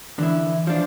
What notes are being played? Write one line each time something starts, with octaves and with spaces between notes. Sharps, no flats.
D3 E3 E4
F3 D4